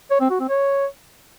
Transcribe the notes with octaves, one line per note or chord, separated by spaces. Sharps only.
C#5
C4
F#4
C4
C#5